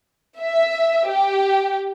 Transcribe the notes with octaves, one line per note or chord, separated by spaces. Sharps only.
E5
G4